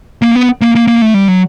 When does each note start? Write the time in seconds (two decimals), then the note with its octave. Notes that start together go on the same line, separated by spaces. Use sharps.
0.22 A#3
0.35 B3
0.62 A#3
0.75 A#3
0.87 A#3
1.02 A3
1.14 G3
1.28 F#3